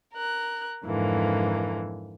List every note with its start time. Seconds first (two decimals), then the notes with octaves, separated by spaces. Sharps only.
0.13 A#4 F#6
0.85 F2 G#2 D3 E3 A#3